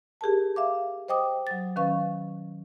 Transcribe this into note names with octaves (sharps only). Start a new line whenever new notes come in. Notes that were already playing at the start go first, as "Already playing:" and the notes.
G4 G#4 A#4 A5
E5 F5 D6
C5 D#5 G5 D6 D#6
F#3 A6
D#3 F#3 C#4 B4 F5 C#6